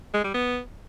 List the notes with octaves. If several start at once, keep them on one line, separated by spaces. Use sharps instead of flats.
G#3
G3
B3